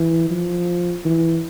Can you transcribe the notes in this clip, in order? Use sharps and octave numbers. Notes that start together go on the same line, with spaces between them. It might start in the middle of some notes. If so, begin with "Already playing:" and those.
Already playing: E3
F3
E3